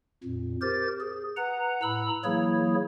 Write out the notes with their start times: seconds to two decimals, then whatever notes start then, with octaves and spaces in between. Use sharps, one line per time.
0.23 F2 A#2
0.62 G4 A#4 C5 A6
1.00 G#4
1.37 B4 F#5 A#5
1.82 A2 A#5 B5 E6
2.24 E3 F#3 A#3 E4 G#4 C#5